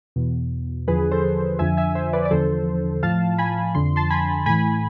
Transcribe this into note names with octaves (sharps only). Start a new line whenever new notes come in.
E2 B2
E2 D3 F3 G#4 B4
A4 C5
F2 D3 F3 E5 G#5
E5 G#5
C5 E5
B4 D5
D5
E2 D3 F3 A4 C5
A2 F3 F5 A5
G#5 B5
F2 D3 F3 C6
A5 C6
G#5 B5
A2 E3 G#5 B5